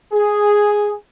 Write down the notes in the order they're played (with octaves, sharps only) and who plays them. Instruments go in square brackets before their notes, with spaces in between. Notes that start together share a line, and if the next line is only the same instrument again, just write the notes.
[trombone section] G#4